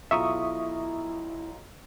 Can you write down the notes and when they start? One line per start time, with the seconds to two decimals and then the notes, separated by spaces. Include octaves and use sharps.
0.11 B1 E4 F4 E5 A#5 C#6 D#6